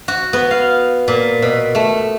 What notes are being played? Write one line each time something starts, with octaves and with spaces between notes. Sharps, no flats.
F#4
B3
F5
A#2
B2
A3